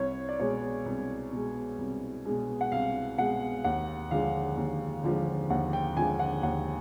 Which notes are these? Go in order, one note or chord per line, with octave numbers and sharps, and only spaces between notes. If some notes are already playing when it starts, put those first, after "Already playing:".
Already playing: C2 C#5
D5
B2 G#3 C#5
C2
B2 G#3
C2
B2 G#3
F#5
C2 F5
B2 G#3 F#5
D#2 F#5
D3 F3 G#3 F5
D#2
D3 F3 G#3
D#2 F#5
G5
D3 F3 G#3 G#5
F#5
D#2 F#5